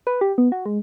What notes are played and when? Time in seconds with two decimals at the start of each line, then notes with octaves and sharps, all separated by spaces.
0.07 B4
0.21 G4
0.38 B3
0.52 F#4
0.66 G#3